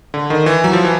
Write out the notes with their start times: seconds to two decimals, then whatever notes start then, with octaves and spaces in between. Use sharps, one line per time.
0.14 D3
0.30 D#3
0.46 E3
0.64 F#3
0.73 F3
0.84 E3